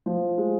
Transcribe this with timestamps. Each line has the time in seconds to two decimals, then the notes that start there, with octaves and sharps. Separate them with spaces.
0.06 F3
0.38 G#3